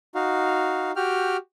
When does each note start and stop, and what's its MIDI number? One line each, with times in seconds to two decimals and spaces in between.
0.15 0.92 63
0.15 0.92 66
0.15 0.92 77
0.96 1.37 66
0.96 1.37 67
0.96 1.37 79
0.96 1.37 89